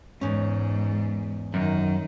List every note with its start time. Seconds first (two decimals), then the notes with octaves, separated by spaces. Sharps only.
0.21 E2 G#2 G#3 C#4
1.54 F#2 D#3